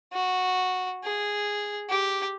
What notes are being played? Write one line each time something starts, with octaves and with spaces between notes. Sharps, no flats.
F#4
G#4
G4